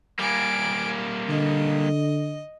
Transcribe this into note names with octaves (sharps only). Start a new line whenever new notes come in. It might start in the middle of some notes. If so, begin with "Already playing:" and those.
G3 A#3 G#5 D7
D3 D#5